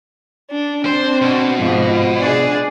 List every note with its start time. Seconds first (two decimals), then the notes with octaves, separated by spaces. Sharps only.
0.50 D4
0.85 C4 D4 C5
1.22 B2
1.58 G#2 F3
2.18 D4 G#4 D5